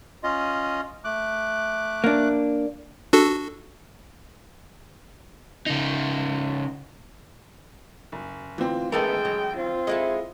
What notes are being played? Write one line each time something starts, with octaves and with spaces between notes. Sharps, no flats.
C#4 F4 D#5
A3 D6 F#6
A#3 D4
D4 F#4 A4
C#3 D#4
F#1
D2 E3 C4 F4
A1 G#3 A3 B3 A4 A#4 G5
F#3
C4 F4
G#3 E4 A4 D#5